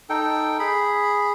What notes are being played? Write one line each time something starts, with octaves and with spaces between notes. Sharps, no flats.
D#4 A4 G5
G#4 B5